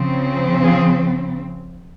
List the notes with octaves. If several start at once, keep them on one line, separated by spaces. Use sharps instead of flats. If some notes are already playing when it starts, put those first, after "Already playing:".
Already playing: C#3 F3 C4
F4 G#4